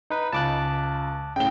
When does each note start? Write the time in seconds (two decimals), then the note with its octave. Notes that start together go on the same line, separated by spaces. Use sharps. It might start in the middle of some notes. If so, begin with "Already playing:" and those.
0.10 D#4 B4
0.33 C#2 A5 D6 F#6
1.36 A2 C#3 G5 G7